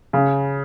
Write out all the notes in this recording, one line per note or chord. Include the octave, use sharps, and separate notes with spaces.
C#3